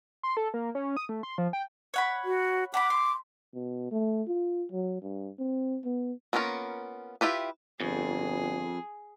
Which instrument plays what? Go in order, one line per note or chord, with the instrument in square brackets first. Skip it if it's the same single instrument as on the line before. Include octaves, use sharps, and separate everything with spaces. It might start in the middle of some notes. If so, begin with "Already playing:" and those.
[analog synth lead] C6
A4
A#3
C#4
D#6
A3
C6
F3
G5
[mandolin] C#5 F#5 B5
[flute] F#4
[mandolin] F#5 A5 B5 [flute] D6
[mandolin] C6
[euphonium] B2
A3
F4
F#3
G2
C4
B3
[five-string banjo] A#3 B3 C#4 F4 A#4
E4 F4 G4 B4
[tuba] G1 [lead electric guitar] F2 [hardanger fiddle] G#4